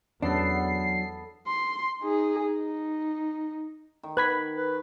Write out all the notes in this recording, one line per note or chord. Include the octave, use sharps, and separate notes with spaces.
E2 F#3 B3 C#4 D4 A4 C7
C6
D#4 G#4
D#4
D#3
B4 B5 F#6 G#6 B6
B4